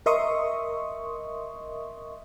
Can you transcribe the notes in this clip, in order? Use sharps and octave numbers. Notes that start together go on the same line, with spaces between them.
A#4 D#5 E5 C6 C#6 D#6